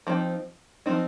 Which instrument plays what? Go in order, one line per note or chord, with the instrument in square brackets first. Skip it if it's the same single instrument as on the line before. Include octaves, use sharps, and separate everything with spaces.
[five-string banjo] F3 C4 D#4
F3 C4 D#4